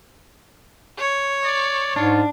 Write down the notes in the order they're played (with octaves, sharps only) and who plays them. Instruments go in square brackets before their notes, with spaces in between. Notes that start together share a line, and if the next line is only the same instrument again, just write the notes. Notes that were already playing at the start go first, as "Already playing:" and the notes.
[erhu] C#5
[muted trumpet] D5
[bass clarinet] G#2 [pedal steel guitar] D4 [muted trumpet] F4